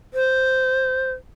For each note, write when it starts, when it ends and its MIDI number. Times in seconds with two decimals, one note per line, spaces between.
0.14 1.12 72